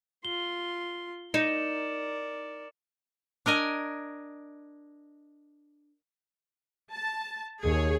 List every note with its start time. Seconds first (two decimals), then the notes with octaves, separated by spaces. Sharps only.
0.25 F4 C6 G7
1.34 D#4 A#4 D5 C#7 E7
3.46 D4 A#4 D#5 G#5
6.92 A5
7.64 D#2 G#4 C#5